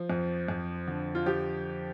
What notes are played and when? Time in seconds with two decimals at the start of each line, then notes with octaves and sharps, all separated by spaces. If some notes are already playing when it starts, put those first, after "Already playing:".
Already playing: F3
0.10 F2
0.48 F2
0.87 D3
1.15 F4
1.26 F3 G4